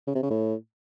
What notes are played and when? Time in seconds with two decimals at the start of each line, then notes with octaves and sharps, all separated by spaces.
0.07 C#3
0.15 C3
0.22 C#3
0.30 A2